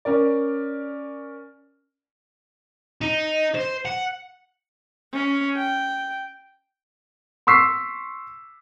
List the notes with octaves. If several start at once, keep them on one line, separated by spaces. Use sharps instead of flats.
C#4 A#4 D5
D#4
C5
F#5
C#4
G5
C6 C#6 E6 B6 C7